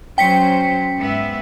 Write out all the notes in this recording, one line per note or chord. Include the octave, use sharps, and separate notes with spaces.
F#3 C#4 C5 G5 B6 C#7
G#2 B3 E5